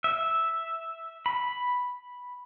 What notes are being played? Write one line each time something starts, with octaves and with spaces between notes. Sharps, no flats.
E5
B5